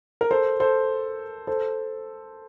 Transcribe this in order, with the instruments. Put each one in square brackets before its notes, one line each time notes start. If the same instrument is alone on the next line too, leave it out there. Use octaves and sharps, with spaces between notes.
[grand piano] A#4
A4 C5
A4 C5
A4 C5